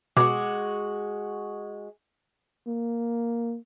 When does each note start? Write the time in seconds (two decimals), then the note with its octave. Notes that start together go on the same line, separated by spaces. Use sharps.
0.17 B2 G#3 F#4 D6
2.67 A#3